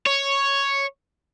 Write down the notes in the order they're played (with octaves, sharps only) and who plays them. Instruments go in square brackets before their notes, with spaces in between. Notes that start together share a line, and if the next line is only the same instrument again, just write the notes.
[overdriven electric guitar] C#5